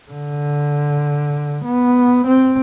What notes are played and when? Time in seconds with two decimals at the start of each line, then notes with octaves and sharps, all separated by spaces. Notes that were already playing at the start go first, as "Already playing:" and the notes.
0.11 D3
1.65 B3
2.27 C4